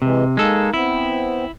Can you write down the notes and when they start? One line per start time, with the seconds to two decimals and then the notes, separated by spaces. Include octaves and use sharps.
0.02 C3 E3 G#3
0.37 G#3 A#3 D#4 A4
0.74 B3 C4 E4